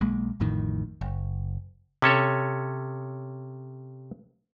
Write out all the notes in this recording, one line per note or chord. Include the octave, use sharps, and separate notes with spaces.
B1 G#3 A#3
A1 F2 A2 D#3
F#1
C3 C#4 A4 C#5